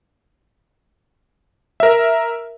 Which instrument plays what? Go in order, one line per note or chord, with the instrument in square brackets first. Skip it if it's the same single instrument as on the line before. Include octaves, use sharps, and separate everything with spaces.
[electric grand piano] A#4 E5